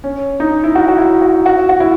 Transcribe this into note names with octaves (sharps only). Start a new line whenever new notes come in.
C#4
D#4
E4
F#4
F#4
E4
F#4
F#4
F#4
E4